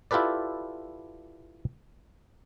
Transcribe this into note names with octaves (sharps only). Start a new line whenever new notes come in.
E4 F4 G4 A4 B4 D5